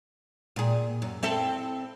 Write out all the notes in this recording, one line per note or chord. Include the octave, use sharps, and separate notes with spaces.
A#2 G#4
F#2
C4 E4 A4